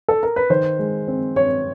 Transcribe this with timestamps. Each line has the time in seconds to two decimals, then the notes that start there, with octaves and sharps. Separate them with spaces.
0.08 A4
0.23 A#4
0.36 B4
0.50 D#3 C5
0.79 G#3
1.08 C4
1.36 C4 C#5